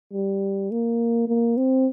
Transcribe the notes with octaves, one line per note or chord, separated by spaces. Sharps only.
G3
A#3
A#3
C4